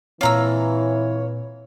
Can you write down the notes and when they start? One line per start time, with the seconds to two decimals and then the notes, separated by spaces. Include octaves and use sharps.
0.21 A#2 E3 C4 F4 C#5 A#5 E6